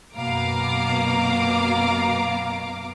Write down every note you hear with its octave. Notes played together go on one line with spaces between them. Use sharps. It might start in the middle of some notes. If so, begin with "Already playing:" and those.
F#2 B2 A#3 F5 A#5 D6